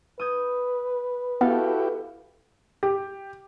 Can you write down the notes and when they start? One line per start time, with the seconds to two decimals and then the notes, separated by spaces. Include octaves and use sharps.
0.20 B4 D#6 G6 G#6
1.41 B3 E4 F#4 G4 A4 F5
2.83 G4